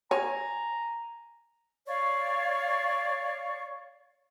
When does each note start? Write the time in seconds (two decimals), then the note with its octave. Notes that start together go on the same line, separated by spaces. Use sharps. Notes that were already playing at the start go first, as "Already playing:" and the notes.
0.11 C#5 G#5 A#5
1.87 C#5 D5 F5 C#6